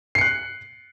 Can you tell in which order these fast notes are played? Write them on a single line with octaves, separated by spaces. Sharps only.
C7 C#7 F#6